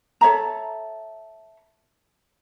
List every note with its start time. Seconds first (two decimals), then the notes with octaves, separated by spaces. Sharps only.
0.21 A4 C#5 E5 A#5